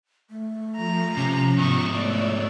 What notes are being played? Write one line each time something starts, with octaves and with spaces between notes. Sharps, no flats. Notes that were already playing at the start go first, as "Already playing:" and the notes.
A3
F3 A#5
C3 C#4
G#2 E3 B3 C#6
A3 C#5 D5 E6